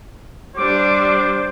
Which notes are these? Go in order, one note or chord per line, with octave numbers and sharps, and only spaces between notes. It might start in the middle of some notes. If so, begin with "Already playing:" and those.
G3 D4 C5 D6